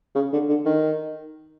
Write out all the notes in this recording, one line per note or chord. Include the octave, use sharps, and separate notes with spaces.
C#3
D3
D3
D#3